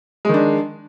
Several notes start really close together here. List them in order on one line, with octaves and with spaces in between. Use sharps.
G#3 D#3 D4